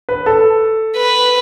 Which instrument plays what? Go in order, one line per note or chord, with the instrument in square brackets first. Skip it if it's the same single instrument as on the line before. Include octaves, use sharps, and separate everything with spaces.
[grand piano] B4
A4
[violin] B4